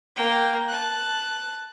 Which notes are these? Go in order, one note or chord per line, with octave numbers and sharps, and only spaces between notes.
A#3 G5
A5 F#6